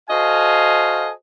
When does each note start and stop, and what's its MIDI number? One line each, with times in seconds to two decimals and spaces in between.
0.10 1.11 66
0.10 1.11 69
0.10 1.11 72
0.10 1.11 75
0.10 1.11 77
0.10 1.11 80